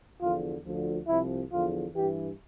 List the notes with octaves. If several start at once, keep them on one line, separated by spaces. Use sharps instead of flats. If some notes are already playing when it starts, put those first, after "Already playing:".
E2 D3 F3 F4
D2 D3 F3
C2 C3 F3 E4
E2 D3 F3 F4
G2 E3 G4